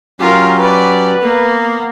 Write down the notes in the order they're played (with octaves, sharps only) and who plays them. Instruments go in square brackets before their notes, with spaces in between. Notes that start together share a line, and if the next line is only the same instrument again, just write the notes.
[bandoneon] F#3 C#4 G4 [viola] F4 A#4
[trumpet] B4 [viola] D5
[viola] A#3 [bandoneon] B3